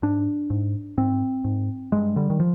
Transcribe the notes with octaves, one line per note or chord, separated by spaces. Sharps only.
G#2 D4
G#2
G#2 C4
G#2
G2 G#3
D3 G3
D#3
F3